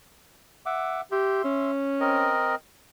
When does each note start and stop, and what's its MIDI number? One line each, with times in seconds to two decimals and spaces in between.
0.66 1.01 76
0.66 1.01 78
0.66 1.01 86
1.12 1.44 67
1.12 1.71 76
1.12 1.71 84
1.45 2.34 61
2.00 2.55 60
2.00 2.55 70
2.00 2.55 75